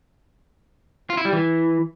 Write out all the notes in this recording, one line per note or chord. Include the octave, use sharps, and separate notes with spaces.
F4
E4
G3
E3